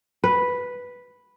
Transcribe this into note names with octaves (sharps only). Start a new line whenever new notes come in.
B4